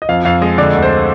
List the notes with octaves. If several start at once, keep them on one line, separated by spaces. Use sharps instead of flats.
D#5
F2 F5
F2 F5
G#3 D#5
D3 D5
D2
C5